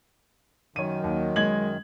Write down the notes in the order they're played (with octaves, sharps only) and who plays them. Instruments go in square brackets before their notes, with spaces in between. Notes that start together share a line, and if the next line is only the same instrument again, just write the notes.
[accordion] F#2 D#3 [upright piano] C#5 D#7
[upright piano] D#2
G#3 G#6 F#7